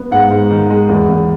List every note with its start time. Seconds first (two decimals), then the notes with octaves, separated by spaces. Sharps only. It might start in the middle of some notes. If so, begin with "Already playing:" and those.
Already playing: B3
0.11 G#2 F#5
0.31 G#2
0.51 D#3
0.70 G#3
0.89 E2
1.09 E2